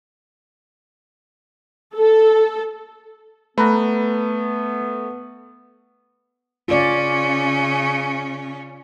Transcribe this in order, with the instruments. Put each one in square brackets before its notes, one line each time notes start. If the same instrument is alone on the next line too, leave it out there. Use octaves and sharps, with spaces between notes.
[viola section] A4
[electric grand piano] A3 [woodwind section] B3 [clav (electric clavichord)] B4 A#5
[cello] C#3 C#4 [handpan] F4 D5